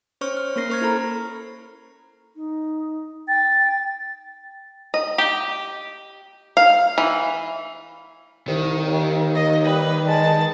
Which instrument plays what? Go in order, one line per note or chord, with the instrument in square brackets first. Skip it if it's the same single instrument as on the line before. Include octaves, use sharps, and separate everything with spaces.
[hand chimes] C#4 C5 C#5 C#6 F6
F6
A#3 C#4 A#4 A#6 C7
A#4 C5 C#6 F6 G#6
E4 A4 A#5 B5
[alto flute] D#4
[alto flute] G5 [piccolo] A6
[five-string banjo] D#5
G4
F5
E3
[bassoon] C2 [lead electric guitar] D#3
[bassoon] D#2
[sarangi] D#5
[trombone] G3 [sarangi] B4
[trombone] G#3 [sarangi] A5